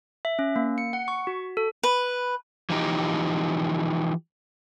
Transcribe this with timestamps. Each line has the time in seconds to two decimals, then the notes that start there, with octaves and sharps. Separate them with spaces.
0.25 E5
0.39 C#4
0.56 A#3
0.78 C#7
0.93 F#5
1.08 C#6
1.27 F#4
1.57 A4
1.83 B4
2.70 E3 F3 D#4 G4